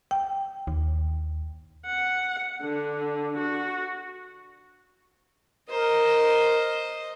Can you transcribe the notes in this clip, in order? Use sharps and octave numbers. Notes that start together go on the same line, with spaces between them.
G5
D#2
F#5
D3
F#4
A#4 C5 D#5